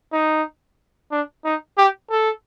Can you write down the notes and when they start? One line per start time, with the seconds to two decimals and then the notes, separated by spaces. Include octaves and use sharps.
0.13 D#4
1.11 D4
1.45 D#4
1.78 G4
2.10 A4